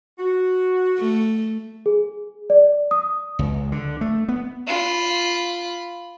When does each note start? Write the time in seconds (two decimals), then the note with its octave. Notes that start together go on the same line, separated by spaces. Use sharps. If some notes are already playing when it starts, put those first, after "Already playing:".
0.19 F#4
0.99 A3
1.86 G#4
2.50 D5
2.91 D#6
3.39 C#2
3.72 D3
4.01 A3
4.28 B3
4.68 F4 B5